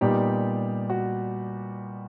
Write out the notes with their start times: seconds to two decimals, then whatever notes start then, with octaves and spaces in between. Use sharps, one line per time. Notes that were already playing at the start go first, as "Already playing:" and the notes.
0.01 A#2 G3 B3 D#4 G4
0.90 F#4